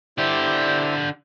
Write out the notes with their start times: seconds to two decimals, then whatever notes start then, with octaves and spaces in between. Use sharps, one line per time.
0.18 D3 E4 G4 C5 D5